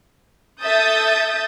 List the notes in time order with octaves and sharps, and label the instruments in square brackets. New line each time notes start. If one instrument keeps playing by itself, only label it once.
[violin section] A4 E5 D#6 G6 A6